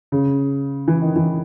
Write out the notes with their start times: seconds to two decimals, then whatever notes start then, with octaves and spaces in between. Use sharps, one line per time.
0.12 C#3
0.88 E3
1.02 D#3
1.16 E3